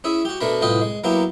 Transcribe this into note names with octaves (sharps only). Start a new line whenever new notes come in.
C#4 E4 G#4 E5
F#4 G4
B2 A3 D4 A#4 A#5 B5
C2 A2 F4 B4 D#5 G5
G#3
F#3 A#3 B3 E4 G4